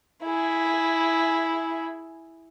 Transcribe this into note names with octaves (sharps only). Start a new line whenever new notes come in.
E4 G#4